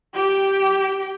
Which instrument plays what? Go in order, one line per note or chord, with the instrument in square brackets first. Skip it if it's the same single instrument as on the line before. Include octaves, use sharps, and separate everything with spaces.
[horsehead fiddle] G4 G5